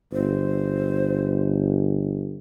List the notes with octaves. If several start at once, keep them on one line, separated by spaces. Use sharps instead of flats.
G1 C5